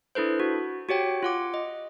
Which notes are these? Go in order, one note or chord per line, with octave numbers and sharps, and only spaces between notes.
D4 E4 A4 B4 C5
F#4
F#4 G4 C#5 G5
F4 F#5 D6
D#5